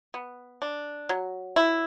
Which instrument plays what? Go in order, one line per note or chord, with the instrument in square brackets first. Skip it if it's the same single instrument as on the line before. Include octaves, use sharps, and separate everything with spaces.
[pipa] B3
D4
F#3
E4